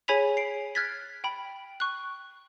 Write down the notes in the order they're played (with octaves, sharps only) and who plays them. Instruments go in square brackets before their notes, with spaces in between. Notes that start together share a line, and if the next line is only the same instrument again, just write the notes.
[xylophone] G#4 C#5 G#5 B5 B6 F7
C7 D7
F6 F#6 G#6 A6 B6
G5 B5
C#6 F#6